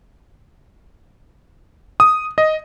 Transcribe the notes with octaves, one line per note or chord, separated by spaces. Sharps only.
D#6
D#5